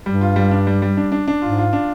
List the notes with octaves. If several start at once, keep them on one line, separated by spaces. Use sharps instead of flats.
G2 G3
F4
G3
D4
G3
G3
D4
D4
D4
G#2 F4
F4
D4